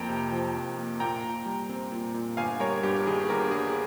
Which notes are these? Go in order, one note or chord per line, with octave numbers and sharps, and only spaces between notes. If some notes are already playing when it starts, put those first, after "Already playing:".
Already playing: F2 A#3 G5 A#5
C3
F3
F2
A#3
A#2 G5 A#5
A#2
G3
C4
A#2
A#2
G1 F5 G#5
G3 A#4 C#5
G2 G4
D#3 G#4
G1 G4 A#4
G3 G#4